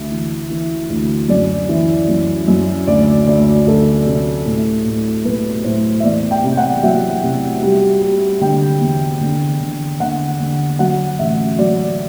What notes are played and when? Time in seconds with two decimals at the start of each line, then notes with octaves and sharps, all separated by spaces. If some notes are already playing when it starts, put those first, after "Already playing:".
Already playing: D2 E5
0.11 E3
0.50 E3
0.90 D2
1.29 F#2 D5
1.69 E3
2.08 F#2
2.48 F#2
2.87 D2 D5
3.27 D2 D5
3.67 D2 A4
4.06 C3
4.46 A2
4.85 A2
5.25 B1 B4
5.64 A2 C5
6.00 E5
6.04 E2 D5
6.31 G5
6.44 C3
6.57 F#5
6.83 F#3 E5
7.23 C3
7.63 G3
8.02 G3
8.41 D3 G5
8.81 E2
9.21 D3
9.60 D3
10.00 D3 F#5
10.40 D3
10.79 F#3 F#5
11.19 A1 E5
11.58 F#3 D5